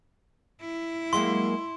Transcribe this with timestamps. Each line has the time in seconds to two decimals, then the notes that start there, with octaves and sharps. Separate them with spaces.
0.61 E4
1.13 F#3 G#3 A#3 C6